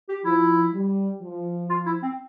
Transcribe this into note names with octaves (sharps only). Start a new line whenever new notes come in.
G4
F3 E4
G3
F3
F4
E4
C4